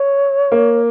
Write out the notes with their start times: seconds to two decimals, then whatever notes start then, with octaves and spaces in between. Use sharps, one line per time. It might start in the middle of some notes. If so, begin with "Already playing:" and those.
Already playing: C#5
0.52 A#3